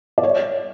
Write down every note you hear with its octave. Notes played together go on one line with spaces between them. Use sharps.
D5
C#5